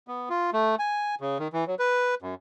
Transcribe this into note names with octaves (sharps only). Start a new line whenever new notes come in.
B3
F4
A3
G#5
C#3
D#3
E3
F#3
B4
F#2